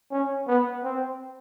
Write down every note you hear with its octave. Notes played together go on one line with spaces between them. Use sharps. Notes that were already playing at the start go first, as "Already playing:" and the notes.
C#4
B3
C4